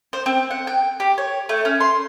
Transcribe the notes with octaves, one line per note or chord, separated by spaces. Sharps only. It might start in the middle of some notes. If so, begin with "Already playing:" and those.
C5
C4
F#5
G5
G4
C#5
A3
C#4
C6